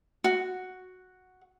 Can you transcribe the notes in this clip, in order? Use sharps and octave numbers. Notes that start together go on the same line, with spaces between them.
F#4